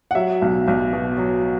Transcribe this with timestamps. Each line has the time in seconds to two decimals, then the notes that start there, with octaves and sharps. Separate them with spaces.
0.11 F#5
0.15 F#3 E5
0.42 B1
0.68 B1
0.93 B2
1.18 F#3